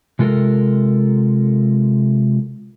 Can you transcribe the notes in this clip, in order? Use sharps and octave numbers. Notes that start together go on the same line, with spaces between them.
C3 G#3 F4 A4 A#4